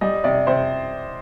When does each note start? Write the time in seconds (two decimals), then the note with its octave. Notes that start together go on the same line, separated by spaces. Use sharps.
0.01 G3 D#5
0.24 C3 D5
0.47 C3 C5